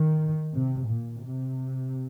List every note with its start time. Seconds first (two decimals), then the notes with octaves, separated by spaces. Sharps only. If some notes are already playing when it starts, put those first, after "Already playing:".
Already playing: D#3
0.54 C3
0.89 A#2
1.25 C3